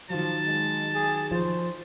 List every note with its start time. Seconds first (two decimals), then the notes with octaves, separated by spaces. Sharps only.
0.10 D#3 F3 F#3 A5
0.46 G#3
0.94 G#4
1.32 F3 C5